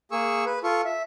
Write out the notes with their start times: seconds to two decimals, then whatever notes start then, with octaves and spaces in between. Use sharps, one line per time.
0.11 A#3 G#4 C#6 E6
0.46 B4
0.64 F4 A4 C#6
0.85 E5